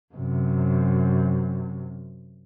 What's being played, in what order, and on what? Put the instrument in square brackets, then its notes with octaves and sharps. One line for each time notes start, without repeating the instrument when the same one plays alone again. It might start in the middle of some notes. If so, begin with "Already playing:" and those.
[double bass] F#2 C3